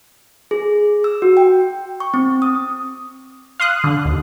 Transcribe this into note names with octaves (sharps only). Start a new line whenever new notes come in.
G#4
E6
F#4
G5
C#6
C4
D#6
F5 C6 D#6 F#6
D3
D#2